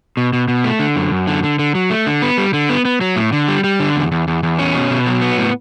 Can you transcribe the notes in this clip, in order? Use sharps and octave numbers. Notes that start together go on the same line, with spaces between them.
B2
B2
B2
A3
D3
F#2
F#2
D3
D3
D3
F#3
A3
D3
B3
G3
D3
B3
B3
F#3
A2
D3
G3
G3
D3
E2
E2
E2
E2
C#4
B2
B2
F#3
B3
A2